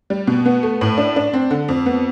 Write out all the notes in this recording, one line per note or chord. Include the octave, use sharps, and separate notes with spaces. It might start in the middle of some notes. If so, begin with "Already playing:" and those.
G3
B2
B3
A3
A2
D4
D4
C4
D3
F2
B3